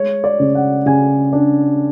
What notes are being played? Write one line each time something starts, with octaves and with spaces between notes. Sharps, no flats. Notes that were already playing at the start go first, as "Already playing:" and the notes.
Already playing: G#3 C#5
D5
C#3
F#5
C#3 G#5
D4